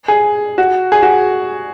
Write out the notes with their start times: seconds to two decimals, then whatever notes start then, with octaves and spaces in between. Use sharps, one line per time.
0.08 G#4
0.58 F#4
0.92 G#4
1.03 F#4